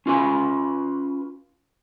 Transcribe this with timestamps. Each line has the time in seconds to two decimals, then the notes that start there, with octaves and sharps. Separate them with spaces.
0.06 C#4 F4 B4 G#5